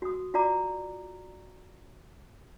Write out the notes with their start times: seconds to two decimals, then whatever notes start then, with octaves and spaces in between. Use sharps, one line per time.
0.02 F#4 D#6
0.34 F4 F#4 D5 A#5 D6